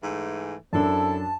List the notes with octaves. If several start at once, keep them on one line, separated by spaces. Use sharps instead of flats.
G#2 E3 A3
F#2 C4 D4 E4 A4 A5